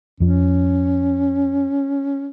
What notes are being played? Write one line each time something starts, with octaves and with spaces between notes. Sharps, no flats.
F2 F3 C#4